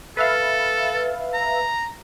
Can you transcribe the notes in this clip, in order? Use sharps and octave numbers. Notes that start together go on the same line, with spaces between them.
A4 B4 E5 F5
A#5